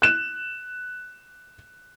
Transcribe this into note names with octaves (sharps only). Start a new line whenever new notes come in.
F#6 E7